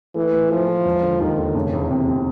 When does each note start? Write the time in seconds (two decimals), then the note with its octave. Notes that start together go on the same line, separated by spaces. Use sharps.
0.15 E3 A3
0.33 A2
0.50 F3 A3
0.68 A3
0.85 E1
1.02 D3
1.21 D#2 D#3
1.38 D3
1.55 F1 C#3
1.73 E2
1.90 C3
2.08 C3